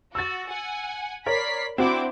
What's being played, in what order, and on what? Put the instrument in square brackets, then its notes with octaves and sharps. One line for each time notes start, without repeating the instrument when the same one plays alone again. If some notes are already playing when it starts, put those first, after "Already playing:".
[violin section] F#4 [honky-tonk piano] E6 A6
[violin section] F#5 G#5
[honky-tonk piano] A#4 C#5 D5 [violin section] B5 B6 C7
[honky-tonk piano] C4 F#4 [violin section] D4 E4 D6